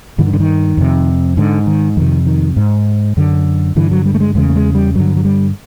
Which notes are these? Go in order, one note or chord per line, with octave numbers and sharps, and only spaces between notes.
G2 D3 E3
D#3
D3
D#3
F2 C3
G#2 D3
D#3
F2 C3 D#3
D#3
G#2
F#2 D3
G2 D3 E3
F#3
G3
A3
G#3
E2 C#3 G#3
A3
G#3
G3
G2 D3 F#3
F#3
G3